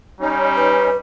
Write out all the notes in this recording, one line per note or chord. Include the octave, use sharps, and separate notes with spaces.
G3 C#4 D#4
B4